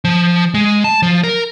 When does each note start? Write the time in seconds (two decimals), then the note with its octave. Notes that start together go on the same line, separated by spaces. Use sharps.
0.05 F3
0.54 G#3
0.84 A5
1.02 F3
1.24 A#4